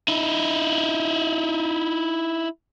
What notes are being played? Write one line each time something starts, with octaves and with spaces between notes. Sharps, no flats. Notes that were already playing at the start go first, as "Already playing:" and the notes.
D#4 E4